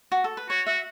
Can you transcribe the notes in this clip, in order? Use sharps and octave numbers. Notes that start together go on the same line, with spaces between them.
F#4
A4
B4
F#4 C#5
F#4 E5